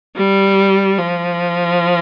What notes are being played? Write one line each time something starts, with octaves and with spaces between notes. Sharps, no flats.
G3
F3